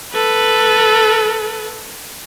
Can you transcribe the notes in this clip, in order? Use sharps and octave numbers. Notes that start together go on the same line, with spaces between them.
A4 B4